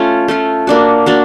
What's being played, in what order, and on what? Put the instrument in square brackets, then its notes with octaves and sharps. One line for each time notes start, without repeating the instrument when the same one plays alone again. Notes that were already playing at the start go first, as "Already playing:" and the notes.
Already playing: [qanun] A3 C#4 F4
A3 C#4 F4
A#3 D4 F#4
A#3 D4 F#4